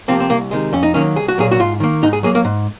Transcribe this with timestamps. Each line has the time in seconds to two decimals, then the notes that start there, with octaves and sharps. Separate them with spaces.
0.08 C3 F3 A#3 C4
0.20 C4
0.30 C2 A#3
0.51 C3 D#3 G#3
0.73 F2 C#4
0.83 D#4
0.94 D#3 F#3 A#3 C#4
1.16 C2 G#4
1.28 F#4
1.38 A#2 F#3 A#3 G#4
1.51 F#4
1.60 G#2 F4
1.80 D#3 A#3
2.03 G#2 D#4
2.13 G#4
2.23 F#3 A#3 G#4
2.35 A#3
2.45 G#2